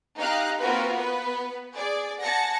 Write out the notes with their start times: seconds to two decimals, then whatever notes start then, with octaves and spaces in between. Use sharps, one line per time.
0.20 D#4 G4 F5 A#5 F#6
0.60 A#3 C4 F4 F#4 A#4 B4
0.96 B3 B4
1.74 G#4 D5
2.21 F#5 G#5 A5 A#6 C#7